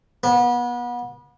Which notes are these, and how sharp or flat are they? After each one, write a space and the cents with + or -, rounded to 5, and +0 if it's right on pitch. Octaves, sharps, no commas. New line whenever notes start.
B3 -30